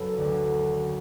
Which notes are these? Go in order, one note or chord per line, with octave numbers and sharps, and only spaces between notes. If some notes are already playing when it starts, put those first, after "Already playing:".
Already playing: F#1 F#2 A4 B4
D2 D3